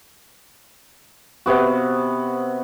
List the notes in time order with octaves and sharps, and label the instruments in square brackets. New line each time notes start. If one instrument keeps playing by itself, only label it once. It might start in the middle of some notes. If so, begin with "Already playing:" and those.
[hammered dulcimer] C3 B3 F#4